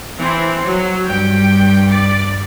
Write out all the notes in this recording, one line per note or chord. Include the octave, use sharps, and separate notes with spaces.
E3 C4
F#3
G2 G3 G5
D5